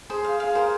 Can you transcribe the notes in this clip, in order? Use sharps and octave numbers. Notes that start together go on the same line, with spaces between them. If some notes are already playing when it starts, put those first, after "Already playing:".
G#4 C5
F5
G#4 F5
A#4 C5